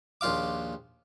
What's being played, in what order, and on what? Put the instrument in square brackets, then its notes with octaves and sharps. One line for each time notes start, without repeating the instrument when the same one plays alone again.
[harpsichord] A#1 D#2 F4 F5 D6